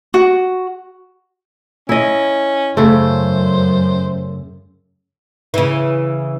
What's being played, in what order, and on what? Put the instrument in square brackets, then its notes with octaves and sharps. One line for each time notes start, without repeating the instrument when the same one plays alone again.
[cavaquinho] F#4
[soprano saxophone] C#4 [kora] E4 D#5
[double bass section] F#2 [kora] C#3 A3 [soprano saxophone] C5
[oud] C#3 E3